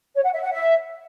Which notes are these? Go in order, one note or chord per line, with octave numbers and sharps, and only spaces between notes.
C#5
F#5
E5
F#5
E5